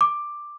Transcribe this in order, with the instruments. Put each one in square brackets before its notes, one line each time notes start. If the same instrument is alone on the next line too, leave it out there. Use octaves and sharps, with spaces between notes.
[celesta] D6